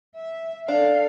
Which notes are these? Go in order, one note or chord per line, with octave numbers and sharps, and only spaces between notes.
E5
D4 A4 F5